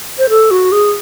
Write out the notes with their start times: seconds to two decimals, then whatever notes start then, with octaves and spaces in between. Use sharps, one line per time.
0.18 C5
0.29 A4
0.51 F#4
0.72 G#4